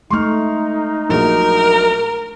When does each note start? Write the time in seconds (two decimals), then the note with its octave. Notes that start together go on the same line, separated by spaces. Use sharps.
0.10 G#3 A3 D#4 C6 C#6 F6
1.09 A#1 F#3 G#4 A#4